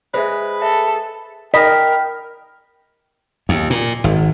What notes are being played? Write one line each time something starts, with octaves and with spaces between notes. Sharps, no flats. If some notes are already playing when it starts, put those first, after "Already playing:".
G#3 G#4 B4 C5 E5
A4 E5
A#4 D#5 G5 B5 B6
D#2
A#2
G#1